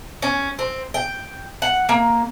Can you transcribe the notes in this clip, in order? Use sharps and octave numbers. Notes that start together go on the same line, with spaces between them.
C#4
C4
G5
F#5
A#3